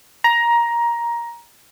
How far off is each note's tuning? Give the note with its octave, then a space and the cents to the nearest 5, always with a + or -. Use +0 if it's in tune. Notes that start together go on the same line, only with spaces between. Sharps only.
A#5 +15